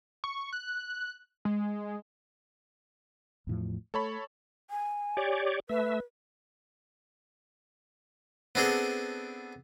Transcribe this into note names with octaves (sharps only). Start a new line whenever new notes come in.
C#6
F#6
G#3
E2 A2 F3
A3 A4 C#5 B5
G#5
G4 C#5 D5
A3 B4 E5
B3 C4 D4 G#4 A4